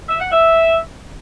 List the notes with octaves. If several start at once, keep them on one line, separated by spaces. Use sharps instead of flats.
E5
F#5
E5